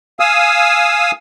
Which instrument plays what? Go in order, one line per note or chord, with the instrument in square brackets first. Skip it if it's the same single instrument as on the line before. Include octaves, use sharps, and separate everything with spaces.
[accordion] F5 G#5 D#6 E6